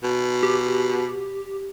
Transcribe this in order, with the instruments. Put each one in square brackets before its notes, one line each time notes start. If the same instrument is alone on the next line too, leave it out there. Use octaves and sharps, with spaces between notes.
[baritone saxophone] B2
[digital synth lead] G4